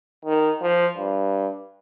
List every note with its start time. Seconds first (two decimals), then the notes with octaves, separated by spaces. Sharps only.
0.25 D#3
0.62 F3
0.97 G2